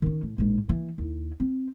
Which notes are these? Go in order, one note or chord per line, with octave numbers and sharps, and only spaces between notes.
D#3 C#4
A2
A#1 G#2
E3 A#3
D#2 E4
C4